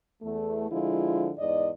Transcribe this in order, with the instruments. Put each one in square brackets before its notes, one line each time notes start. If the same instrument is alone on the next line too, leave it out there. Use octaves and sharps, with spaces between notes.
[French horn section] E2 A3
D3 F3 G#3 E4 F4
E2 G#2 D5 D#5